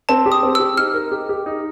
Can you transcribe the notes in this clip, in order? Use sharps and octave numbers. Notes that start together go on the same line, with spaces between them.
C4 A5
G4
D#6
C4
E6
G4
D#4 F6
A#4
G4
G4
D#4